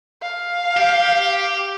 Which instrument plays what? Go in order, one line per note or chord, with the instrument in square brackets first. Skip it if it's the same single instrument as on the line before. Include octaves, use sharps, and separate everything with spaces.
[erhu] F5
[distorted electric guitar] G4